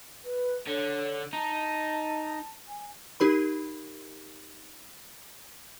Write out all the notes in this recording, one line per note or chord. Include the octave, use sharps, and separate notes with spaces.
B4
D3 C#5
D#4 A5
G#5
D#4 G4 A#4 B5